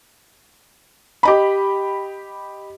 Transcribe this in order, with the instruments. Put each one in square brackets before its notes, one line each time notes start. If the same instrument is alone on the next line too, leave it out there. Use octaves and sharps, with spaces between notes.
[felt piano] G4 D#5 B5